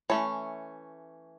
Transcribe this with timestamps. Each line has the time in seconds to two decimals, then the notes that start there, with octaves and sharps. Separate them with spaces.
0.10 E3 A3 C#4 C#5